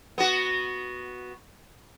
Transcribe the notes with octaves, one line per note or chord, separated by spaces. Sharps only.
B3 F#4